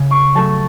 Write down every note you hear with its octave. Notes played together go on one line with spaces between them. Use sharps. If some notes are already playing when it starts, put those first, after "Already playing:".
Already playing: C#3
C#6
F#3 A3 A5